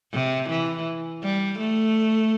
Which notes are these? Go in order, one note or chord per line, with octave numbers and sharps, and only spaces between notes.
C3
E3
G3
A3